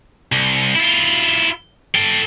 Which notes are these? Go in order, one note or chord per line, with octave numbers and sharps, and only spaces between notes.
C2
E4 F4
A4 G5